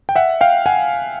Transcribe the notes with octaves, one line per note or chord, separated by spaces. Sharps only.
G5
E5 F#5
F5 G5
F#5 G#5